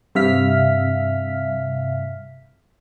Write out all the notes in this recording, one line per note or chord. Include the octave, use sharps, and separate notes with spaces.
G2 C3 E5 F5 F6 B6